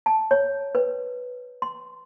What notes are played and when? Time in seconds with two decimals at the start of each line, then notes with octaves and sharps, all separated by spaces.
0.06 A5
0.31 C#5
0.75 B4
1.62 C6